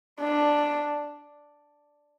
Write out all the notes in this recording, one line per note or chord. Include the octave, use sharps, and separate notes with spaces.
D4